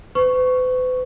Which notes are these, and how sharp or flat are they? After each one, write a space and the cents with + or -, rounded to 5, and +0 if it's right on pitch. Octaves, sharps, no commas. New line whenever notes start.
B4 +45 C#6 +0